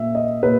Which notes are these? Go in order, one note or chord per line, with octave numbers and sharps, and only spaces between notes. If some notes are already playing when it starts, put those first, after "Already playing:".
Already playing: A#2 E5
D#5
A#2 B4